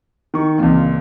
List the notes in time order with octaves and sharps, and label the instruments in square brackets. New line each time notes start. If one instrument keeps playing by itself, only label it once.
[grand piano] D#3 C#6
[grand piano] C#2 A#2 [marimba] E3 C4